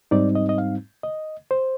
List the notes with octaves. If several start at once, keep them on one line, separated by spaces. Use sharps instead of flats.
G#2 G3 C4 D#4 D5
D#5
D#5
F5
D#5
C5